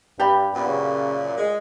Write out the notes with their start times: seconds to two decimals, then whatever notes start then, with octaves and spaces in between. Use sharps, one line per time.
0.19 G2 G4 D5 B5
0.55 F#2 A#2 B3
0.68 C#3
1.37 G#3